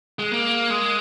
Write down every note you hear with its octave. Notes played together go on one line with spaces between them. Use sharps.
G#3
A#3
G#3